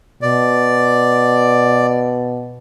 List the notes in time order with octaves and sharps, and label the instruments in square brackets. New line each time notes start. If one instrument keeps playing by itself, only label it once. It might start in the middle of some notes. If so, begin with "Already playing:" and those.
[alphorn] B2 [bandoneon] D5